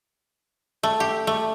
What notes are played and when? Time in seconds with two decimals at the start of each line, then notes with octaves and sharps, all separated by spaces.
0.83 A3
1.00 G4
1.27 A3